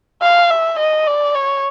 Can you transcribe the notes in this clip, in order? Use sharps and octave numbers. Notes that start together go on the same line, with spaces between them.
F5
E5
D#5
D5
C#5